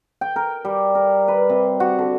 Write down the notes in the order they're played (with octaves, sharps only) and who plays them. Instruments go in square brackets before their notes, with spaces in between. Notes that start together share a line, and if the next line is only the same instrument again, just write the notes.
[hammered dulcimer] G5
A#4
G3
A#4
B4
C3
F#4
D3